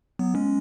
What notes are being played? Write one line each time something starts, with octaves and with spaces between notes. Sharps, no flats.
F#3 B3
G#3 C#4